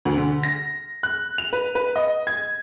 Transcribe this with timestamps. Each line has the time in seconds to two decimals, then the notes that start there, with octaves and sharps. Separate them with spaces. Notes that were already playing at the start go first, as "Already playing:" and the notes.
0.05 D2
0.17 D3
0.43 A#6
1.03 F#6
1.38 F7
1.53 B4
1.75 B4
1.96 D#5
2.27 G#6